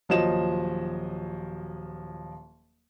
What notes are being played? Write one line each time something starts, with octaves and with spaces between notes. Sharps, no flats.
D#1 F3 F#3 D#5 E7